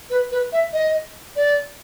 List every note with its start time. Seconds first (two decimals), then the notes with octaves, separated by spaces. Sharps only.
0.10 B4
0.31 B4
0.53 E5
0.73 D#5
1.36 D5